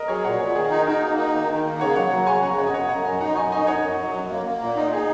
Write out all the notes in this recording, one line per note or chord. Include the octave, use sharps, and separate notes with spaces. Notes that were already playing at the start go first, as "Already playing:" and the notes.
Already playing: A#4 D#5
F#3 G#4 C#5
A#2 C#5 F#5
A#2 G#4 C#5
D#3 G#4
D#4
D#4 F#4 A#4
A#3
D#4
D#3
D#3
A#3
C#3 C#5 F#5
F#3 C#5 F#5
F#3 F#5 A#5
C#3 G#5 C#6
C#3 F#5 A#5
F#2 C#5 F#5
D#5
F#2 C#5 F#5
F#2 F#5 A#5
F#2 D#5 G#5
D#4 F#5 A#5
F#2 G#5 C#6
D#4 D#5 G#5
F#2 C#5 F#5
F#2
F#3
F#2
A#3
A#3
A#2
D#4
D#4 G#4